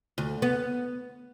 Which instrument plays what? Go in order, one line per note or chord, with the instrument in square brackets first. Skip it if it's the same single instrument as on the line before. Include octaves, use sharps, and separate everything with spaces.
[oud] D2
B3